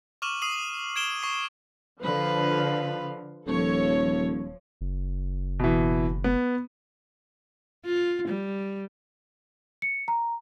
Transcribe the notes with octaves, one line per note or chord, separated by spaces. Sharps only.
C#6 D6 F6 D#7 E7 F#7
D#6 C7 D#7 F#7
G#6 D7 E7 G7
C#6 C7
D3 F3 B4 F5
D#1 F3 A4 C#5
F#1
B2 E3
B3
F4
G3
C#7
A#5